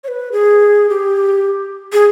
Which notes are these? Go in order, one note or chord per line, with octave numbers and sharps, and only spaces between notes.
C#5
B4
G#4
G4
G#4